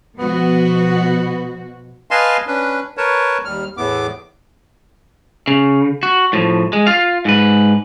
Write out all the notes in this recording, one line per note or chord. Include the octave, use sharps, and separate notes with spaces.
B2 F3 B3 F#4
B4 D#5 F5 G#5 A5 C6
C#4 D4 B4
A#4 B4 C#5 A5
D#2 G3 F6
E2 A2 B3 D6
C#3
F#4
A2 F3
G#3
F4 F5
G#2 B4